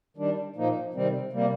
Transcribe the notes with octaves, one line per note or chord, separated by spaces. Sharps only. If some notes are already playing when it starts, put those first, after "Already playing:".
D#3 G3 D4
A#2 F3 A#3 D#4
C3 D#3 G3 C4
C3 G3 A#3